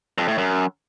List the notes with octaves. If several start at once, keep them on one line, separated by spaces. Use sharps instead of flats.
F2
A2
F#2